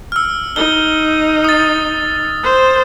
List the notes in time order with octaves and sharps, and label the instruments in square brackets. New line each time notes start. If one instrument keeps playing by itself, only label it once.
[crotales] E6 F6
[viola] D#4 [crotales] G7
[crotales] D#6 A6
[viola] C5